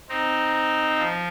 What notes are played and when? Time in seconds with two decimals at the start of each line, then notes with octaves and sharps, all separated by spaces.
0.09 C4 D#4
0.99 F3